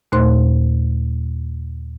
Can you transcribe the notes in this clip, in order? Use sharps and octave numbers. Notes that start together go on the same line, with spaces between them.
D#2 A#2 A3 C5 C6 F#6